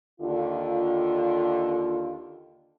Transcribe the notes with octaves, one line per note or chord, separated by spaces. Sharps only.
D#2 D3 F4